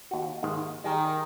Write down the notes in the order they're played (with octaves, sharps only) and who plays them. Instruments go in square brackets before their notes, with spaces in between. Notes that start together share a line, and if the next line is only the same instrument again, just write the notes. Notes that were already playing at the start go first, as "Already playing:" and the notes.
[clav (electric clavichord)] D#2 F#4
D#2 G#2 D#3
[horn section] D#3 [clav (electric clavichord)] G3 G#4